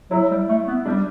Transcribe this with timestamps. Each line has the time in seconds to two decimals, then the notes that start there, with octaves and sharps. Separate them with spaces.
0.11 F#3 E4
0.31 G3
0.49 A3
0.67 B3
0.86 G3 D4